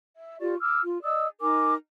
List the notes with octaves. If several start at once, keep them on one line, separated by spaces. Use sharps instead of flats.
E5
F4 G4 D5 C#6
D6 E6 F6
F4
D5 D#5 D#6 E6
D#4 A#4 G#5 D6